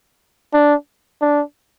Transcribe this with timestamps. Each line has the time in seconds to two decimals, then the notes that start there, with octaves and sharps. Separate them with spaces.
0.54 D4
1.22 D4